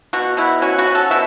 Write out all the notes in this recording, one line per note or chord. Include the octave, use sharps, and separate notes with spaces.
B2 F#4
B2 E4
C#4 F#4
F#4
C#4
A4
B2 E5